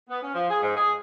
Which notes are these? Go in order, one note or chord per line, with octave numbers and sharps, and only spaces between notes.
B3
C#4
F3
G#4
G#2
G#4